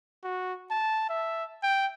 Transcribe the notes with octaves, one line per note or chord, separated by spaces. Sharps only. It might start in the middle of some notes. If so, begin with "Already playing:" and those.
F#4
A5
E5
G5